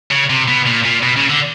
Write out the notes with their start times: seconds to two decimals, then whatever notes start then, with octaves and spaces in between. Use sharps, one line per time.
0.11 C#3
0.30 C3
0.48 B2
0.66 A#2
0.84 A#2
1.02 B2
1.16 C#3
1.30 D3